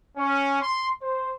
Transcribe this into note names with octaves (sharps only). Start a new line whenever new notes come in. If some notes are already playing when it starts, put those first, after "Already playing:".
C#4
C6
C5